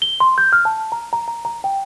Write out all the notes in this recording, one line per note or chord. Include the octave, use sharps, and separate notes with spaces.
G7
C6
G6
F6
A5
A#5
A#5
A#5
A#5
G5